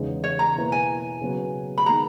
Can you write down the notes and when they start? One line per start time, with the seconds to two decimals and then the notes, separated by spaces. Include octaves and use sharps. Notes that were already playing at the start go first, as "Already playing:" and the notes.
Already playing: E2 C#3 G#3 B3 D#4
0.24 C#5
0.39 A#5
0.56 B2 A#3 E4 B4
0.72 G#5
1.21 C#3 F#3 B3 F#4 B4
1.78 B5
1.86 D#3 G#3 B3 A#5